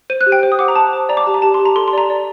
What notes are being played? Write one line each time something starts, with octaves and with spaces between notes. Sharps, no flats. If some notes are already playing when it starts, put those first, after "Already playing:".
C5 D#7
F#6
G4
G5
C5
D#6
F#5 D6
A#5
C5 A5
C5
D5 A#5
D6
G4 A5
A#5
G4 A5
C6
G4
A#5
A4 C6
C6
D5 A#5
D5